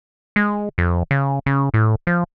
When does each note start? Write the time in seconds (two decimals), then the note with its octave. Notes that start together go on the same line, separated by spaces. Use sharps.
0.36 G#3
0.78 F2
1.11 C#3
1.46 C#3
1.74 A2
2.07 F3